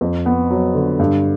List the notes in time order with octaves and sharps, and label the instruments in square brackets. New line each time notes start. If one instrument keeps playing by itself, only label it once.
[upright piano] F2
B3
F#3
D3
G2